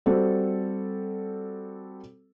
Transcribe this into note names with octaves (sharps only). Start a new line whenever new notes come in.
G3 C4 F#4 A4